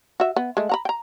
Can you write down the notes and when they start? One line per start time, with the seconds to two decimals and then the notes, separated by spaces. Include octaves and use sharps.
0.20 F#4 E5
0.36 B3
0.57 G#3 A3
0.69 F#5 A#5 B5
0.85 G5 A#5